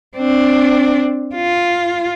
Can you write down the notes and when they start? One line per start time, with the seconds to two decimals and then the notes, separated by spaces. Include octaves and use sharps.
0.16 C4 D4
1.35 F4